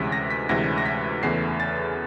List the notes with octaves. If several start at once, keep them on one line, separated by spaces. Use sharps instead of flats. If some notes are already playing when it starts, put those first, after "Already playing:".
Already playing: D2 C3 E3 G#3 C#4 B6
A#6
B6
D2 C3 E3 G#3 C#4 A#6
A#6
B6
E2 C#3 E3 A3 C7
A6